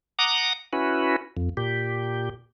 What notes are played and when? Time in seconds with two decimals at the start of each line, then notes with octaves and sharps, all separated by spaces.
0.19 F#5 A#5 D6 D#6
0.73 C#4 E4 F#4 B4
1.37 F2
1.57 A#2 G4